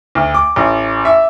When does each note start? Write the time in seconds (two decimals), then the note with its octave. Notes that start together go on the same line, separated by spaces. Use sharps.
0.15 D2
0.34 D6
0.56 A1
1.05 E5